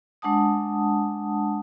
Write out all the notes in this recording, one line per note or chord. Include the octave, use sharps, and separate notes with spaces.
G#3 D4 F#5 A5 D#6